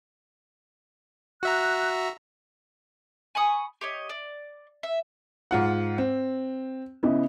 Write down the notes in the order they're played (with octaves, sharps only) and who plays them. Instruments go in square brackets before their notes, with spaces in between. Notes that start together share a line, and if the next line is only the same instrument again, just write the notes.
[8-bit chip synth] F#4 E5 A#5 [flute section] F#6
[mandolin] G#5 B5 C#6 D#6
G4 C#5 D#5
D5
E5
[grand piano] G#2 F4 F#5
C4
[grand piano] C#3 [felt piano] B3 E4 D#5